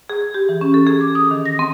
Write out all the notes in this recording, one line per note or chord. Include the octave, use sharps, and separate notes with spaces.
G#4
G4
E3
C#4
A4
G#4
D6
D#6
D#3
A#6
C4